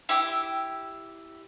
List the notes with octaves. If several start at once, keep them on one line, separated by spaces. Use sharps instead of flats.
E4 G4 E6